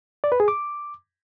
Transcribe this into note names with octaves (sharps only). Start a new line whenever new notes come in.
D5
B4
G#4
D6